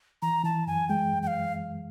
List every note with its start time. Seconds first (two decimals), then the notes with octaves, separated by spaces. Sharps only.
0.22 E3 A#5
0.44 E3 A5
0.67 F#2 G#5
0.89 G#3 G5
1.12 F#2
1.23 G5
1.27 F5